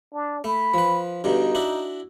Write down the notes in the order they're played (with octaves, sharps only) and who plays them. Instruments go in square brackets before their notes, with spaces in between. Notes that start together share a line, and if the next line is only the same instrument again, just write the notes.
[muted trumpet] D4
[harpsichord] A3 [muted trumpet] B5
[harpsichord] F3 B4
[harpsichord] G2 B2 D3 [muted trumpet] D#4
[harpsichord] D4 E4 F#4